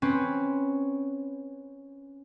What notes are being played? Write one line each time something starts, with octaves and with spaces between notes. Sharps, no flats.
C4 C#4 B4